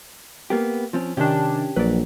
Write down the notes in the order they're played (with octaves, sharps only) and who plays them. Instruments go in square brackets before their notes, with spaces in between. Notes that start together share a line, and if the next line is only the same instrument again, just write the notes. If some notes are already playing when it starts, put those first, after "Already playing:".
[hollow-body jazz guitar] A#3 B3 G4
F3 C4 C#4
[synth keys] C3 D#3 D4 [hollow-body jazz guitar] C#4 G4
[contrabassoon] A#1 [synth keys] F#3 [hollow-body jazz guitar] B4 D5